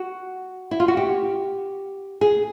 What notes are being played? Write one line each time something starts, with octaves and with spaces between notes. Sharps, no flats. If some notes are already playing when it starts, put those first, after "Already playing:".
Already playing: F#4
E4
F4
F#4
G4
G#4